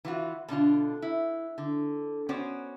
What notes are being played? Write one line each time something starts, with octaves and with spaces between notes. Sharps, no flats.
E3 F4 F#4
B2 D3 D4 F4
E4
D3
B3 C#4 F#4 C5 D5